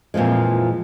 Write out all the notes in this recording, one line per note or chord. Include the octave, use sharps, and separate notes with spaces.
F2 A#2 E3 F3 G#3